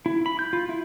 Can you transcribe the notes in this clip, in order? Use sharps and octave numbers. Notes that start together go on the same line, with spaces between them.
E4
B5
G6
F4
E4